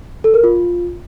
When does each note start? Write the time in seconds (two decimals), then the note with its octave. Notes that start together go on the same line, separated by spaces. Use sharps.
0.24 A4
0.34 A#4
0.44 F4